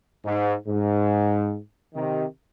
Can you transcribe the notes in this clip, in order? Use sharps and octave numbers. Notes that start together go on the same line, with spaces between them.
G#2
G#2
C3 D#3